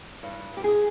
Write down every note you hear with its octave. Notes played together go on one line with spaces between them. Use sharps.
G2
G2 G4
G#4